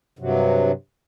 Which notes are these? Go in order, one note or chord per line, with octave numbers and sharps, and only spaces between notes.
G2 C3 F#3